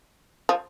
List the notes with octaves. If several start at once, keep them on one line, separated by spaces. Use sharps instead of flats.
F3